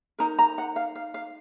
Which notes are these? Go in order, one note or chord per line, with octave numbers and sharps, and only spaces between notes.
D#4 A#4 A#5
A#5
F#5
F5
F5
F5